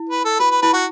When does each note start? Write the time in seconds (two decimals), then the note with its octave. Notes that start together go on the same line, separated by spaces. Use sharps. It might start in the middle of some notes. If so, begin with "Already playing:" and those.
Already playing: E4
0.09 B4
0.25 A4
0.39 F#4 B4
0.51 B4
0.62 E4 B4
0.73 F#4